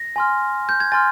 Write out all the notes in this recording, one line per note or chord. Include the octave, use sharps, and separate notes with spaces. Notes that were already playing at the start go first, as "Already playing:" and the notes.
Already playing: A#6
G#5 C6 F6
G6
G#6
G#5 C6 F6 A6